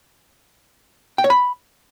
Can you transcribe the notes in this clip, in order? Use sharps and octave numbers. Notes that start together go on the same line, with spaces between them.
G5
C#5
B5